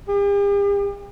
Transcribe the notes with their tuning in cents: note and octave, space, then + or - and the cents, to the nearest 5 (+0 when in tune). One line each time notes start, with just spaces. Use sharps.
G4 +45